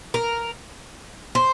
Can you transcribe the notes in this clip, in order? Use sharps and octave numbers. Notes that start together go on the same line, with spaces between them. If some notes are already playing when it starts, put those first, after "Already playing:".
A#4
C5